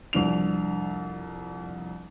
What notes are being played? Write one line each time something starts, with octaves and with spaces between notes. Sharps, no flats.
C2 F2 D4 F7